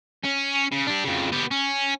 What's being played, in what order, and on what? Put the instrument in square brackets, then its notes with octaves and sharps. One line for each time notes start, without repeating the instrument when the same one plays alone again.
[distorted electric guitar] C#4
C#3
D4 G4
F2 C#3
B3 G4
C#4